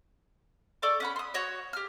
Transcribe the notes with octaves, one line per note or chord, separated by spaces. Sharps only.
A4 D5 C#6 D6
C#4 F#5 B5
C6 D#6
F#4 C#5 D#5
G4 F6